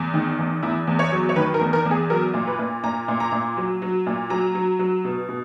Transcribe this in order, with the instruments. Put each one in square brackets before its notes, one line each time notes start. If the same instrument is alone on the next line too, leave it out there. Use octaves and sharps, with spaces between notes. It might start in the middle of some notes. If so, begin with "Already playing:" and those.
Already playing: [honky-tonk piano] E2
D#3
E2
E2 E4
E2
C#5
F#3
C#5
D#3 B4
A#4
E2
A#4
E2
G#4
F#3 A#4
A#2
B4
A#2
A#2 A#5
A#2
A#5
A#2
F#3
F#3
A#2
F#3 A#5
F#3
F#3
B2
B2